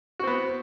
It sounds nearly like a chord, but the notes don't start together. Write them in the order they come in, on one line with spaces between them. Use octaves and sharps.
F#4 C4 B3